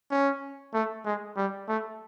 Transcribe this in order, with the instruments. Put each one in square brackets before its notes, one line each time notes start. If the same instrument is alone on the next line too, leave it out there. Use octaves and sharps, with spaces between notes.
[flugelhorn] C#4
A3
G#3
G3
A3